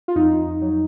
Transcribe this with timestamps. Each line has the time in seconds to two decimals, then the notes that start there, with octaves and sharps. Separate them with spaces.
0.08 F4
0.15 F2 D#4
0.62 F#3